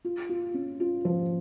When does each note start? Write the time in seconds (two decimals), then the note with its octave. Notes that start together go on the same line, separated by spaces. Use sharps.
0.05 F4
0.29 F4
0.54 C#4
0.80 F4
1.05 F3